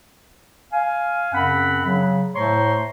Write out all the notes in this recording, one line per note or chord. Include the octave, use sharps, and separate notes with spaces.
F5 G#5
F#2 C#3 C4 F#5 B5
C#3 F#3
A2 A3 C5 C#5 A#5 C6